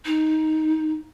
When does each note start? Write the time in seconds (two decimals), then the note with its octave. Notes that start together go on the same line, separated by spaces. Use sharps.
0.05 D#4